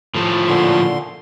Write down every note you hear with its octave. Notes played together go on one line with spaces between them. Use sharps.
A2 F3 A3
A#2 D3 C6